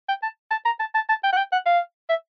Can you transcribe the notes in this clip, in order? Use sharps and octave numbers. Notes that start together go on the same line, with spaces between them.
G5
A5
A5
A#5
A5
A5
A5
G5
F#5
G5
F#5
F5
E5